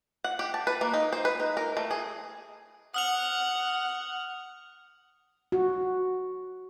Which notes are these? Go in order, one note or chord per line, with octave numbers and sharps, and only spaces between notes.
F#5
G4
A5
B4
A#3
D#4
C5
B4
D#4
A#4
A3
G#4
F#5 D#6 F6 F7
F#4